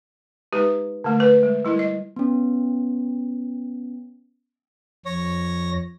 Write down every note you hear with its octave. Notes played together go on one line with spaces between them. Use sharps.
G#3 D#4 G4 B4
D3 A3
B4
G#3
G3 E4 A#4
D#5
B3 C#4
F2 C#5 A#6